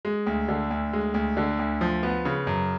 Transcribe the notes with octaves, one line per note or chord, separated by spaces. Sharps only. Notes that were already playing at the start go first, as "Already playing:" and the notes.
G#3
D2
D3
D2
G#3
D2
D3
D2
F3
B3
C#3
F#2